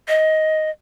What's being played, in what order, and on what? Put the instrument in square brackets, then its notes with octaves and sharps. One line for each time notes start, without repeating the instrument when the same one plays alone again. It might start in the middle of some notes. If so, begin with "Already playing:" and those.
[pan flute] D#5